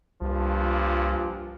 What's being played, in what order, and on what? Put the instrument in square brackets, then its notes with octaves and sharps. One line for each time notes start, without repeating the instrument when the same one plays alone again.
[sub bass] C2 [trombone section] G2 A#2 F3